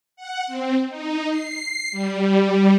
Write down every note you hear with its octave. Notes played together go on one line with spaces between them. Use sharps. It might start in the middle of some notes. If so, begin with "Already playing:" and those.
F#5
C4
D#4
C7
G3